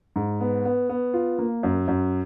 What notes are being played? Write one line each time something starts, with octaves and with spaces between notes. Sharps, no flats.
G#2
B3
B3
B3
F4
A#3
F#2
F#2